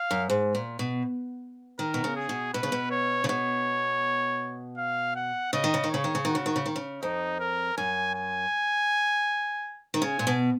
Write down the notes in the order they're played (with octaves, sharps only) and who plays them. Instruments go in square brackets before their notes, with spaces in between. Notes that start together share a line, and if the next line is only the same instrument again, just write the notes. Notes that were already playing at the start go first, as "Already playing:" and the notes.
Already playing: [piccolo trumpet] F5
[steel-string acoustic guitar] F#2
G#2
A#2
B2
[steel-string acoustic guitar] D#3 [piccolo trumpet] A#4
[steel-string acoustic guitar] B2
C#3
[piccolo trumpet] G#4
[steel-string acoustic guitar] B2
[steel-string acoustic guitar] B2 [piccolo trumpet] B4
[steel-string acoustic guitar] C#3
B2
[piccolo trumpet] C#5
[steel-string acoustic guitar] C#3
[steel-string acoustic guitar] B2 [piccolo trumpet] C#5
[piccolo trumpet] F5
F#5
[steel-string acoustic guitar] C#3 [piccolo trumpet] D#5
[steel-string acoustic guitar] D#3
C#3
D#3
[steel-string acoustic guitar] C#3 [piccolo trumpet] C#5
[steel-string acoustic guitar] D#3
C#3
[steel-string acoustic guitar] D#3 [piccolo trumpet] F#4
[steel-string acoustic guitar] C#3
D#3
C#3
D#3
C#3
[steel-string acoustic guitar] F2 [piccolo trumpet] D#4
[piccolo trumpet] A#4
[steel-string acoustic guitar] F#2 [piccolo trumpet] G#5
[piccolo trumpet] G#5
[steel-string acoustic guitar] D#3
[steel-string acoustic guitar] C#3 [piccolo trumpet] G#5
[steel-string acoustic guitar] A#2
B2